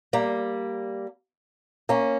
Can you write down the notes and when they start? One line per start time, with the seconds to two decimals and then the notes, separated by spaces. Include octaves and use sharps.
0.13 G3 A#3
1.89 A#3 C#4